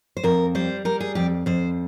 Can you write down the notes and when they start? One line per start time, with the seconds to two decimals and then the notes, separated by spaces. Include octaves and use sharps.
0.17 C5
0.24 F2 A#4
0.55 G3 C5
0.85 G3 A#4
1.00 G#4
1.15 F2 G4
1.46 F2 C5